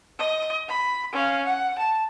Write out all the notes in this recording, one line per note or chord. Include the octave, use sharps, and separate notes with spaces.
D#5
B5
C#4 F5
F#5
A5